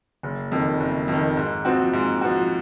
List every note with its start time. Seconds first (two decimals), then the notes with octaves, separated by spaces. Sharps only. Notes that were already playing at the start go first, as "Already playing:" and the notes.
0.23 F#1
0.52 F2 D#3
0.80 F#1
1.08 F2 D#3
1.37 G#2
1.65 F3 C4 F#4
1.93 G#2
2.21 F3 C4 F#4